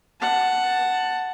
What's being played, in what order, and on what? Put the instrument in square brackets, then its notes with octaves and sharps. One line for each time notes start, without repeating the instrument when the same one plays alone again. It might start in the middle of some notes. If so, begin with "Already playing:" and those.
[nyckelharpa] F#5 A5